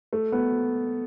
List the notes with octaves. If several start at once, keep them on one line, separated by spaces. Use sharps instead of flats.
A3
B3